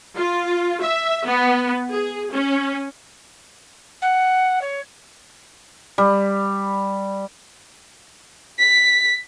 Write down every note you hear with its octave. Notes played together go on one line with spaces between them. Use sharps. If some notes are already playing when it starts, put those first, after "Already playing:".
F4
E5
B3
G#4
C#4
F#5
C#5
G3
B6